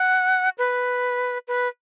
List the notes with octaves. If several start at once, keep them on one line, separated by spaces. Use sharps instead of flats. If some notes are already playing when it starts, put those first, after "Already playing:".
Already playing: F#5
B4
B4